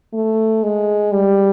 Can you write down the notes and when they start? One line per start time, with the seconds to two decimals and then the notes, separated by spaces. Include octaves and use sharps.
0.14 A3
0.63 G#3
1.12 G3